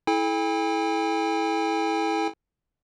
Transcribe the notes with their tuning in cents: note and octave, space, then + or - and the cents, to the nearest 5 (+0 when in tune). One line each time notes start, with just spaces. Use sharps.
E4 -15 A4 -35 G5 +45